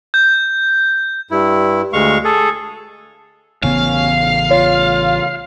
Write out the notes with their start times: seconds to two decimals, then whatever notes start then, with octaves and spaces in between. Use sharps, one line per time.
0.14 G6
1.31 G2 E4
1.93 D2 G#3 F5 C#6
2.24 G#4 A4
3.63 A1 C#3 B3 C#4 F5
4.51 F4 C#5